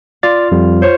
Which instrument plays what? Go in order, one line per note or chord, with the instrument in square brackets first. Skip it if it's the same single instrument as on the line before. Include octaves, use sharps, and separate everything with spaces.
[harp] F4 [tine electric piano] D5 A6
[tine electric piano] F2 G3
[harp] C5 C#5